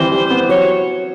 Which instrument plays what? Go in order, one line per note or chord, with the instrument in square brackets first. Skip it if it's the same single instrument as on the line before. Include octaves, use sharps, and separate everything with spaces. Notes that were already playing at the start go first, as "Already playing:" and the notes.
Already playing: [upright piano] E3 G3 [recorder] C5
[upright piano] G3
B3
[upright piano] F#3 [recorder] C#5